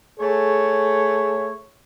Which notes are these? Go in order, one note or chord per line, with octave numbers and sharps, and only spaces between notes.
A3 G#4 C#5